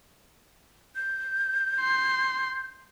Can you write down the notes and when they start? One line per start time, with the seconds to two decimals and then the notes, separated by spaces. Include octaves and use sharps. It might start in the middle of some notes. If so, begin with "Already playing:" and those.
0.96 G6
1.80 C6